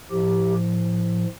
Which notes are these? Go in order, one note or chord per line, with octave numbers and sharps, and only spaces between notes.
A2 F3 G4